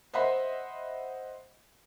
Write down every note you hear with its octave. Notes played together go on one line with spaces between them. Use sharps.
C5 D#5 E5 F#5 B5 C6